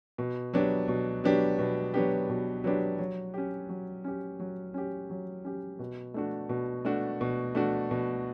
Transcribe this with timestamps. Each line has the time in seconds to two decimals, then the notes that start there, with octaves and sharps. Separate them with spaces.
0.18 B2
0.54 F#3 B3 D4 G4
0.88 B2
1.24 F#3 B3 D4 G4
1.59 B2
1.94 F#3 B3 D4 G4
2.29 B2
2.64 F#3 B3 D4 G4
2.98 F#3
3.34 C#4 G4
3.69 F#3
4.04 C#4 G4
4.39 F#3
4.74 C#4 G4
5.10 F#3
5.44 C#4 G4
5.79 B2
6.14 A3 D4 F#4
6.49 B2
6.85 A3 D4 F#4
7.21 B2
7.55 A3 D4 F#4
7.91 B2